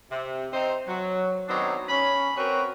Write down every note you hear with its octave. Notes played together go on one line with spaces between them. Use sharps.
C3
C4 D#4 C5
F#3
D#3 F#3 B3 C4 D4 D#4
C#4 B5
C4 F#4 A#4 B4 C#5